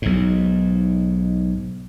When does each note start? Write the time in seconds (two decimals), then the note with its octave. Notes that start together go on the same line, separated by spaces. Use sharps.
0.02 B1 G#2